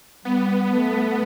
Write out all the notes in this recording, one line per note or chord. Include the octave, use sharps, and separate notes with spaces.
G3 B3
A3